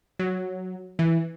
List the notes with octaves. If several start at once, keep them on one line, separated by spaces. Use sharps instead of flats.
F#3
E3